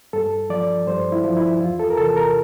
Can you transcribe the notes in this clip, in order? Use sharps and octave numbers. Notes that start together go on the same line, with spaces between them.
G2 A4
F3 D5
G2 C5
E4
F3
E4
E2 F4
A4
A#4
C3 E3 A4
A#4